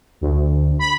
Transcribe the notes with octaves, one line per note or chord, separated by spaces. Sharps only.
D2
B5